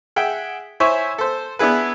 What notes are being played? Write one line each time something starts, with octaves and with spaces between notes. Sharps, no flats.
G#4 E5 F#5 G5
E4 C5 C#5 E5 G#5 C#6
A4 C5
B3 D4 E4 G#4 B4